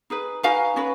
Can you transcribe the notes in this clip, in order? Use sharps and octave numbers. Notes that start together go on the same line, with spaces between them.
D#4 G#4 B4
D#4 F#4 B4 F5 G#5
C#4 F#4 B4